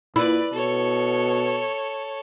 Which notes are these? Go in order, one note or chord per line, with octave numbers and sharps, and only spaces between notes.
A#2 E4 B4 D5
B2 A4 C#5